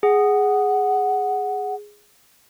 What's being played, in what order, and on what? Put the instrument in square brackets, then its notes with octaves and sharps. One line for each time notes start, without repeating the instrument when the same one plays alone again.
[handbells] G#4 [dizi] F#5